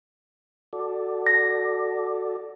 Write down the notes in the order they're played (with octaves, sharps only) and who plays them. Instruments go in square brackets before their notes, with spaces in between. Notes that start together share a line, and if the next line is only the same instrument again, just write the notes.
[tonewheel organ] F#4 A4 D5
[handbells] A#6